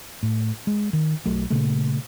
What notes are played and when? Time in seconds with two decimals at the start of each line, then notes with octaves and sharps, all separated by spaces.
0.23 A2
0.67 G#3
0.93 D#3
1.25 B1 F#3 A3
1.50 A#2 C#3 A3